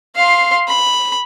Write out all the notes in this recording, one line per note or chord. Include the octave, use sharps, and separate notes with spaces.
F5 C6
B5